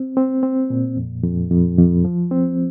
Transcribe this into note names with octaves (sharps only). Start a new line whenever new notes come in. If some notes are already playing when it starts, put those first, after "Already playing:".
Already playing: C4
C4
C4
A#2
F2
F2
F2
F2
F3
C4